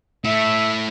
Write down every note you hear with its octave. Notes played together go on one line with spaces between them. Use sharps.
A3 E4 E5